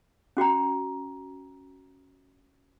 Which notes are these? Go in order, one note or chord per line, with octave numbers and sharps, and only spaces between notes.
C#4 F#4 G5 A#5